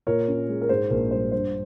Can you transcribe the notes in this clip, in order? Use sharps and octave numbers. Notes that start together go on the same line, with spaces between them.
A#2 A#4 C#5
C#4
G#3
A#4
G#2 C5
A#1 A#4
G3 C5
G2 C5